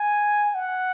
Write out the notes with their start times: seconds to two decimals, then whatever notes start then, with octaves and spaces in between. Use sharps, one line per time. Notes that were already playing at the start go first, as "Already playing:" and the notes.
Already playing: G#5
0.55 F#5